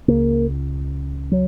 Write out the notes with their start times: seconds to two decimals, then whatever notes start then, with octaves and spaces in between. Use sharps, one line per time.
0.08 C#2 C#3 A#3
1.32 F#3